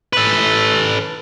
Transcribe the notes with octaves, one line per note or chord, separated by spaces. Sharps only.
A4 B4